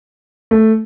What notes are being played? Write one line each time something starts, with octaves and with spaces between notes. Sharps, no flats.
A3